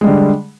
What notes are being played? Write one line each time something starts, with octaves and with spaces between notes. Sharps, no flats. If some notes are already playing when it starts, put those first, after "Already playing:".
D3 G3 G#3